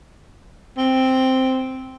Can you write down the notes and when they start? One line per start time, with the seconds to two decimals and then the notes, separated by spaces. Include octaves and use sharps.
0.78 C4